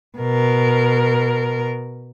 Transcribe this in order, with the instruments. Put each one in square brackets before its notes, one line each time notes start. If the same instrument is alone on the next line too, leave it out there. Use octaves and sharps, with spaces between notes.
[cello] B2 A#4